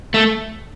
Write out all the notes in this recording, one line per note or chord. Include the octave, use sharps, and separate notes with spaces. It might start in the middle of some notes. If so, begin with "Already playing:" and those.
A3